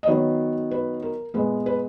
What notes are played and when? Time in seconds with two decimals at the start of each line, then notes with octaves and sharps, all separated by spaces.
0.03 D#5
0.07 D#3 F#3 B3 C#5
0.71 B4
1.02 A#4
1.34 A#2 G#3 B3 B4
1.66 B4